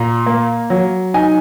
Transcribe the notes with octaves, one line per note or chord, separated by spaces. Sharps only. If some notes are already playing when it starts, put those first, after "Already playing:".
Already playing: A#2 A#5
A#3
F#3
D#4 G#5